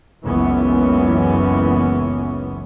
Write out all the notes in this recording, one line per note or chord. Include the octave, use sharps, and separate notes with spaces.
F#1 C#2 F#2 E3 B3 C#4